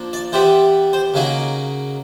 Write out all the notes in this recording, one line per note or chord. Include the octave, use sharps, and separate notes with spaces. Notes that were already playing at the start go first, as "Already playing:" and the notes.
Already playing: F3 A#3 D4
D5
E3 G3 B3 C5
C5
C#3 F#3 A#3 D#4